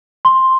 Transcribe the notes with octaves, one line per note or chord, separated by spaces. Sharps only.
C6